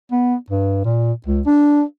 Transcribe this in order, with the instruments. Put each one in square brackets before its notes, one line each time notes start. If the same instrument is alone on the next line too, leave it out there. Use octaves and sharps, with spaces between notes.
[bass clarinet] B3
G2
A#2
C#2
D4